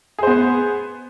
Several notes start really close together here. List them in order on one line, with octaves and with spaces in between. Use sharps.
G#4 C5 B3